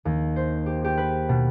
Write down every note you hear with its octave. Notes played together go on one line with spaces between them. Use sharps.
D#2
C5
G4
G4
B4
B2